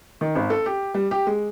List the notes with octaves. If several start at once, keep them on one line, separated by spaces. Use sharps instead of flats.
D#3
G#1
A4
G4
G3
G4
G#3